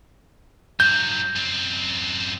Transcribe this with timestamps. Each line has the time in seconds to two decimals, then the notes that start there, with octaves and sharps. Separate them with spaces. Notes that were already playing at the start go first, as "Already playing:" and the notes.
0.80 G2 F#3 G6
1.36 F#2 C4